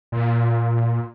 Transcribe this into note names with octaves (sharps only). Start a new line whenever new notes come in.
A#2